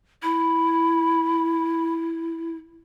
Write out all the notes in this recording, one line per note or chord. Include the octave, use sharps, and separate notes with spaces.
E4 B5